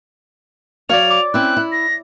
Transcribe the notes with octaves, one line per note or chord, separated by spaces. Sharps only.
F#3 C#5 D5 F5 F7
D6
C4 C#4 E4 F#6
E4
A#6